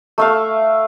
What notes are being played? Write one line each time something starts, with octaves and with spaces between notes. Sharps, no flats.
A3 E5 F5